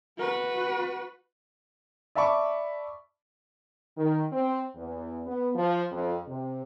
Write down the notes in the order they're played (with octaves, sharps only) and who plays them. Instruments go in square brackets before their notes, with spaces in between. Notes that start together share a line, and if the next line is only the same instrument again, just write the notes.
[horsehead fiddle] F#4 B4
[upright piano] D5 E5 A5 B5 C#6 D6
[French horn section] D#3
C4
E2
B3
F3
F2
C3